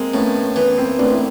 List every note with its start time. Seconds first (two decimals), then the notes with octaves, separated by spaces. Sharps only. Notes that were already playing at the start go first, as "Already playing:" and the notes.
Already playing: G#3 A#3 C4
0.14 A2 B3 C#4
0.56 E3 B3
0.77 A#3 C4
0.99 A1 C4 D4
1.12 E4